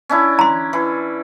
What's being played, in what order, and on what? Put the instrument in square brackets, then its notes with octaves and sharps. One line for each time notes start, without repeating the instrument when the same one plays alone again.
[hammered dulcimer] C#4 D4 E4
[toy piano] A#5 C6
[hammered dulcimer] E3